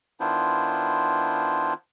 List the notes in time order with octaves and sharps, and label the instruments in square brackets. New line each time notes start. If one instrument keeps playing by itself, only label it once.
[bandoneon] D#3 B3 D4 E4 F4 C5